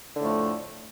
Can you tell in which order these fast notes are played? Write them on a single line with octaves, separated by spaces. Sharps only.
D3 A2 A3 F2